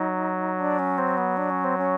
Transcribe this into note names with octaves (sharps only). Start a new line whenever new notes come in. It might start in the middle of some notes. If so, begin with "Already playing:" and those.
Already playing: F#3 D#4
D4
C#4
C4
B3
D4
C#4
C4
C#4